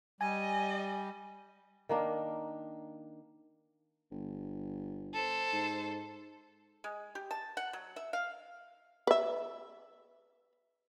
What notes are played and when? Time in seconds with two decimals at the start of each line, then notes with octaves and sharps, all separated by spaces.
0.21 G3 D#5 G#5
1.89 D#3 A#3 D4
4.11 G1
5.13 A4 C5
5.52 G#2
6.84 G#3
7.15 G4
7.31 A5
7.57 F#5
7.73 F#3
7.96 E5
8.13 F5
9.07 B4 E5